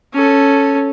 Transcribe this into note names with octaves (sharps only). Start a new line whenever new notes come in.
C#4 A4